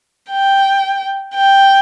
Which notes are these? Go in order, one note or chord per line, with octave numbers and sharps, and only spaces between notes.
G5
G5